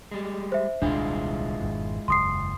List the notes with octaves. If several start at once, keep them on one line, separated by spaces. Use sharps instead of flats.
G3 G#3
C5 E5
D#1 C2 G#3 D4 E4 F4
G#1 F2 B2
F#1 E2 A#2 C6 D#6 C7